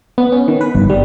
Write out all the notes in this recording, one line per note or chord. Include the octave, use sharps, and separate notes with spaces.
B3
C#4
D#3
B4
G1
G3